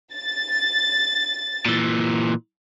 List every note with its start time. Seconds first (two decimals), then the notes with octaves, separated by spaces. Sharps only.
0.15 A6
1.66 A#2 E3